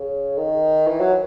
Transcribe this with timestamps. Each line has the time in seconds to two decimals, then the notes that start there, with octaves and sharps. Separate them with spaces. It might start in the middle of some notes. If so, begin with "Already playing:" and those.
Already playing: C#3
0.38 D#3
0.87 E3
1.00 F#3